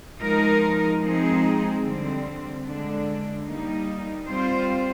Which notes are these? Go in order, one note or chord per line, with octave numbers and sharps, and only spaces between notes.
F3 G#3 D#4 A#4
F3 G#3 C4 D#4 G#4
D3 G3 C4
D3 G#3 D4
G3 A#3 D#4
G3 C4 F4 C5